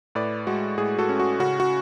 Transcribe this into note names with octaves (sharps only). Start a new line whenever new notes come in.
A2 B4 D5
G#3 F#4
A2 G#4
F#4 A4
C#4
F#4
C#3 F#4
F#4